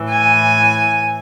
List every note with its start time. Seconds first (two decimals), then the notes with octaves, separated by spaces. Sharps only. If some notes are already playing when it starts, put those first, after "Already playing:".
Already playing: A2 E3
0.09 G#5